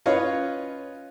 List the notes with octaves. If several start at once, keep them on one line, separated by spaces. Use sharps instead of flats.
C#4 F4 B4 C#5 D#5 F5